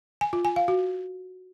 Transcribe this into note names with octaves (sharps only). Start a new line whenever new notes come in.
G#5
F4
G#5
F5
F#4